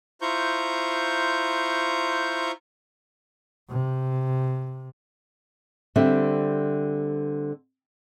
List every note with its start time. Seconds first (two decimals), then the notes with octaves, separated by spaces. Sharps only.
0.22 E4 F4 C5 A#5 C#6 G6
3.69 C3
5.96 D3 G3 C4 E5